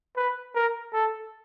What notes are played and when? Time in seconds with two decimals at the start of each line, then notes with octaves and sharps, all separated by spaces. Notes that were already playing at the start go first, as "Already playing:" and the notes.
0.17 B4
0.55 A#4
0.93 A4